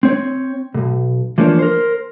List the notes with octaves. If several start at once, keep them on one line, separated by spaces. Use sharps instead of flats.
C4 C#5
B1 G#2
E3 F3 A#3 D4 C#5
A#4 C5